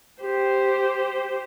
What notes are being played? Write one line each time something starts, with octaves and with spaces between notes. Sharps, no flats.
G4 C5